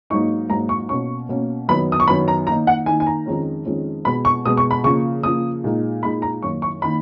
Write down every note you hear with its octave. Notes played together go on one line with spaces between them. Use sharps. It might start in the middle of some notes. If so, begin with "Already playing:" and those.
G#2 F#3 A#3 D#4 C#6
G#2 F#3 A#3 D#4 A#5
C#6
B2 A#3 C#4 C#6
B2 A#3 C#4
F#2 D#3 F#3 B3 B5
D#6
C#6
F#2 D#3 F#3 B3 B5
A#5
D#3 A#3 D#4 A#5
F#5
D#3 A#3 D#4 G#5
G#5
A#5
F2 D#3 G#3 C#4
F2 D#3 G#3 C#4
B2 G#3 B3 B5
C#6
B2 G#3 B3 D#6
C#6
B5
C#3 F3 A#3 C#6
C#3 F3 A#3 D#6
A#2 G#3 D#4
A#2 G#3 D#4 B5
A#5
F#2 D#3 A#3 C#6
C#6
D#3 A#3 B5